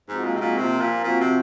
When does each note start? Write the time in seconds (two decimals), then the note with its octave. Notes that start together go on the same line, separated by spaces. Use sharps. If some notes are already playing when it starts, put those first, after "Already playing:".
0.08 G#2 F3 G#3 C4 D#4 F#4
0.24 A#2
0.34 C3
0.40 A#2
0.56 C3 F3 A#3 F4
0.80 A#2
1.03 A#2 F3 C4 F#4
1.20 C3